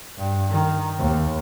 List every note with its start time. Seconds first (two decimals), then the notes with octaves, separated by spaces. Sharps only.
0.18 G2
0.50 D#3
0.99 D#2